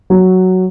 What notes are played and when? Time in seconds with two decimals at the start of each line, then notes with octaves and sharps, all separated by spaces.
0.10 F#3